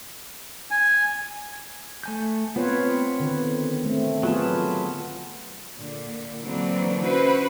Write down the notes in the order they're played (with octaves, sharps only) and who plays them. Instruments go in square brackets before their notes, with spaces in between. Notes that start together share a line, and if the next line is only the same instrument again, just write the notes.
[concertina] G#5
[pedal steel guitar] A3 G#5 G6
[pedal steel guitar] B3 C4 [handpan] F4 B4 C#5
[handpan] D3 D#3 B4
A3 C4
[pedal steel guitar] F#3 B4 A5 [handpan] B3 F4 G#4
[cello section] A#2 D3
D3 E3 F#3 A#3 C4 D4
C#4 E4 F#4 B4 C5